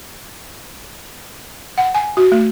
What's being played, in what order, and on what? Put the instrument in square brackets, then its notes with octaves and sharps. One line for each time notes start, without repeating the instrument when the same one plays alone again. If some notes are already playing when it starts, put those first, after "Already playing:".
[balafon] F#5
G#5
F#4
A3